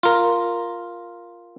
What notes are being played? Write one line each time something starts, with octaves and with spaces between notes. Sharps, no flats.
F4 A#4